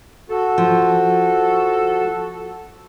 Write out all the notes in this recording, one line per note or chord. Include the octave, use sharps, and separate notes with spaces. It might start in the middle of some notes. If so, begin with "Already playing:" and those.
F#4 A4
F3